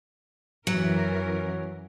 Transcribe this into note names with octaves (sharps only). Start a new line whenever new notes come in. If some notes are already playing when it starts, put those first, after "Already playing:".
F#2 E3 F#3 A#4